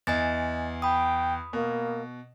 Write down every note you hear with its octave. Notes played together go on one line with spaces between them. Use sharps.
E2 D#5 G#5 A6
G5 B5 D#6
B2 A#3